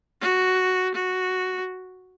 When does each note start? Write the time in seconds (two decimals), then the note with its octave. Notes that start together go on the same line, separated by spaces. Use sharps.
0.21 F#4
0.94 F#4